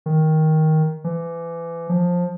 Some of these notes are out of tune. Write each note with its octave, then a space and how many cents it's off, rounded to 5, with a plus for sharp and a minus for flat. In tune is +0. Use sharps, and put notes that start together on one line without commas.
D#3 +10
E3 +30
F3 +15